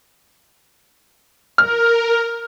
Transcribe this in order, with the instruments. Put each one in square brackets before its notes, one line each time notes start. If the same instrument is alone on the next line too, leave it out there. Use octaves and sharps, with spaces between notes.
[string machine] A#4 [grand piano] F6